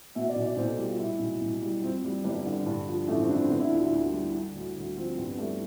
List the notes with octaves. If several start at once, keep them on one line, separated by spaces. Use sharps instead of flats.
B2 E5
D5
B1
D5
B1 C5
A4
G3 G4
F4
A2 E4
B1
B1
G3
F2 C4
G3
G1 G3
D3
G2
F3
A1 A3
C4
D3 D4
C4
D3 B3
D4
E4
D2 F4
E4
D2
G3
D3
D2
D2
F3 C4
G2 C4
B3
G3 A3